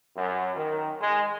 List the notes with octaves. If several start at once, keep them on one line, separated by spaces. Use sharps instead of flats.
F#2
D#3
G#3